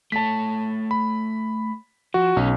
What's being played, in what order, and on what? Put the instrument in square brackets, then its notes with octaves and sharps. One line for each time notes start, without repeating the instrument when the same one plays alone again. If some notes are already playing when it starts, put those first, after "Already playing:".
[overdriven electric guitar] A3 C#5 [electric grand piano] A5 B6
[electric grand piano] B5
[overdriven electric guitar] F3 [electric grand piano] F#4
[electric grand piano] B1 [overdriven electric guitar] C#4